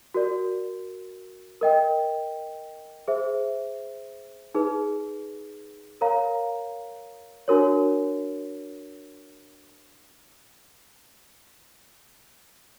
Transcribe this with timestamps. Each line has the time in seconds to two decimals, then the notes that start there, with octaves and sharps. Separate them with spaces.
0.14 F#4 A#4 D5
1.61 A#4 D#5 G5
3.08 G#4 C5 E5
4.55 D#4 G#4 B4
6.01 A#4 C#5 F5 A#5
7.48 D4 F#4 A#4 C#5